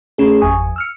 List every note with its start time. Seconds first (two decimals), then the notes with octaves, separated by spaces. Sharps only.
0.18 A3 C#4 G#4
0.41 G#1 F2 G#5 C#6 D#6
0.76 E6 F6 C#7